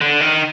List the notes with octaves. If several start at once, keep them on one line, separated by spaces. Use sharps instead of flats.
D3
D#3